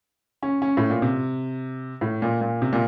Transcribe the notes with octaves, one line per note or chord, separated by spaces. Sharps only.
C#4
C#4
A2
A#2
C3
A2
A#2
A#2
C3
A#2